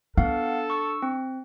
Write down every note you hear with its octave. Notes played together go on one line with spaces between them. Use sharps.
B3 D4 A4 F5 F#5
C#6 E6
C4